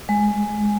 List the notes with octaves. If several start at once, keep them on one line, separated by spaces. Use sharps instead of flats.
G#3